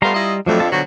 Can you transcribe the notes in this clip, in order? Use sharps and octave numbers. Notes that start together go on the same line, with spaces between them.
G3 A3 B3 F4 A#5 C6
E4 F4 D#5
F2 D3 F3 F#3 A3
F4 A4 A5
B2 D3 F3 F#3